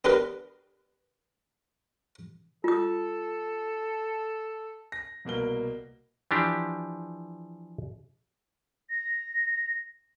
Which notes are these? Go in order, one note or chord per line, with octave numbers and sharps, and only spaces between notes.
B3 D4 G4 A#4 B4
F4 A4 D#6
A#6
C2 B2 A#3 G7
E3 F3 D4 G4
A#6